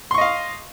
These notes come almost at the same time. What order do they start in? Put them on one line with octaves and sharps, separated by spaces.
C6 C#6 D#5 F5